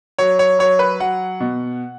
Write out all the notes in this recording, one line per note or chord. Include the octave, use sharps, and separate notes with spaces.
F#3 C#5
C#5
F#3 C#5
B4
F#3 F#5
B2